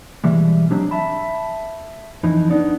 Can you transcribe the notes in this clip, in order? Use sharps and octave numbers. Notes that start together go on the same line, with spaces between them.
B2 E3 G3 G#3
F#3 G#3 C4 D4 G4
E5 A5 B5
F2 E3 D#4
B3 D4 D#4 D5